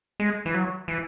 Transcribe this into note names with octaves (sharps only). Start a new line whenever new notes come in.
G#3
E3
F#3
E3